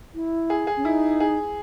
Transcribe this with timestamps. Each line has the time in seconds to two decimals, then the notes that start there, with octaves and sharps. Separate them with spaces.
0.14 E4
0.50 G#4
0.67 G#4
0.77 C#4
0.85 D#4 E4
1.20 G#4